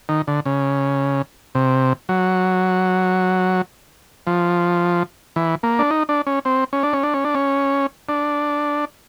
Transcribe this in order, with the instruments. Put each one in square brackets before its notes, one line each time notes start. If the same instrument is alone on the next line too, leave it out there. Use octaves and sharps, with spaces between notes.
[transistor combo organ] D#3
D3
C#3
C3
F#3
F3
E3
A#3
D4
D#4
D4
C#4
C4
C#4
D4
C#4
D4
C#4
D4
C#4
D4